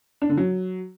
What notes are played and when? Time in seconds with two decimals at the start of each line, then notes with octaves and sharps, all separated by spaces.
0.22 D4
0.29 D3
0.37 F#3